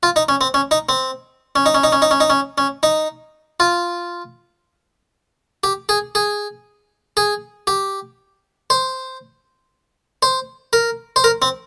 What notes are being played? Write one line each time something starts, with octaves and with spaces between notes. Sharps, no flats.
F4
D#4
C#4
C4
C#4
D#4
C4
C#4
D#4
C#4
D#4
C#4
D#4
C#4
D#4
C#4
C#4
D#4
F4
G4
G#4
G#4
G#4
G4
C5
C5
A#4
C5
A#4
C4